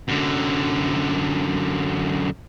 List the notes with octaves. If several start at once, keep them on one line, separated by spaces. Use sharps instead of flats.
F#2 D3